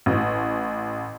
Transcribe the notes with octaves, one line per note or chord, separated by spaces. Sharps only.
A1